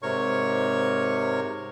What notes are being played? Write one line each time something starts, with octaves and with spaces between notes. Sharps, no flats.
G#2 C3 A#4 C#5 C#6